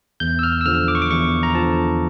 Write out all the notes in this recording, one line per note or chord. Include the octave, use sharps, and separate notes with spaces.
E2 G6
E6
F6
E6
D3 F3 F6
D6
C#6
D6
E2 C#6
A#5
D3 F3 A5